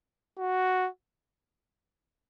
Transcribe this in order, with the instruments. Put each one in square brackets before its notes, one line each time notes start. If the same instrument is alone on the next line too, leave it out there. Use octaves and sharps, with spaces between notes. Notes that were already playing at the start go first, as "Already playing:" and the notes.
[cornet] F#4